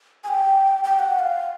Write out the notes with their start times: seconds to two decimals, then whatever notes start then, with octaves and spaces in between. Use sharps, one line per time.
0.24 G#5
0.28 G5
0.84 G5
0.99 F#5
1.14 F#5
1.19 F5